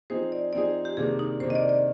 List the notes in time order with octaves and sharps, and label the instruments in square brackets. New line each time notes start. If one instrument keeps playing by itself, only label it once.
[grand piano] F3 C4 D#4 G#4 [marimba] C5
[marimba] D5
[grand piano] F3 C4 D#4 G#4 [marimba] D5
[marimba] G4
[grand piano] C3 D#3 A#3 D4 [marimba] G#4
[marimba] D#4
[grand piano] C3 D#3 A#3 D4 [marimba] C5
[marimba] D#5
D5
D5